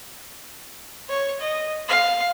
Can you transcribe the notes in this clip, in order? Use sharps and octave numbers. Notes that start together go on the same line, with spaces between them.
C#5
D#5
F5